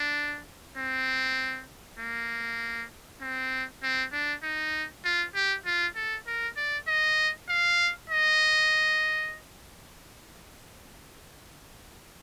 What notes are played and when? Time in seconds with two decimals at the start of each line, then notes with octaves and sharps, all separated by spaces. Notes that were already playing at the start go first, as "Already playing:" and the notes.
Already playing: D4
0.78 C4
1.99 A#3
3.21 C4
3.83 C4
4.12 D4
4.43 D#4
5.05 F4
5.34 G4
5.66 F4
5.96 A4
6.27 A#4
6.56 D5
6.87 D#5
7.49 F5
8.10 D#5